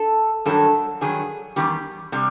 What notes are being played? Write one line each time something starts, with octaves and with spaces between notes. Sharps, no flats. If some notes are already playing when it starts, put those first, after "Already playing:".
Already playing: A4
G2 D#3 F#3 A4
G2 D#3 F#3 G#4
E2 C3 D#3 G3 G4
C3 G3